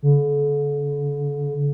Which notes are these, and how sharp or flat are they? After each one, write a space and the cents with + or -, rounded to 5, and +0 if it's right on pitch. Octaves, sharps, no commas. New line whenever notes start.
D3 -40